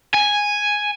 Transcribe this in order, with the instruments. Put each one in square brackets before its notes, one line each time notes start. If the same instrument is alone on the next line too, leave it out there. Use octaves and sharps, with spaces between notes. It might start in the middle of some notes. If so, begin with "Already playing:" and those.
[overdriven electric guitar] G#5